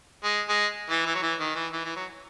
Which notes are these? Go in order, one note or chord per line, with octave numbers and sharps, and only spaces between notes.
G#3
G#3
E3
E3
F#3
E3
D#3
E3
E3
E3
F#3